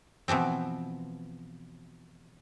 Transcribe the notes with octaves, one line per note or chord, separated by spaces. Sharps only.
B2 E3 F3 C4